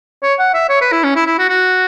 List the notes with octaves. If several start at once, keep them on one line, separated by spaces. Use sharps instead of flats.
C#5
F#5
E5
C#5
B4
E4
C#4
E4
E4
F#4
F#4